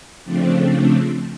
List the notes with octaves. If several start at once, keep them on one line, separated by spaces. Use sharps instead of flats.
C#3 F3 A3 C4 D4